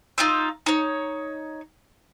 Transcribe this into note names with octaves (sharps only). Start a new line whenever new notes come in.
D#4 F4 E6
D#4 C#5